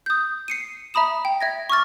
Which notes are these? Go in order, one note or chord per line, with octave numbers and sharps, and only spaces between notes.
D#6 G6
C7 C#7 D#7
E5 A#5 B5 D#6 E7
G5
E5 G#6 A#6
C#6 D6 F6 A6